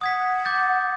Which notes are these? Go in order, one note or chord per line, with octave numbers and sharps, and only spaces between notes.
F#5 D#6 G#6 B6
D6 G6 A6